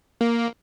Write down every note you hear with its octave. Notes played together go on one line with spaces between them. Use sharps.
A#3